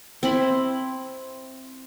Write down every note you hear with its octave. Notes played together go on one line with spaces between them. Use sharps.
C4 E4 B5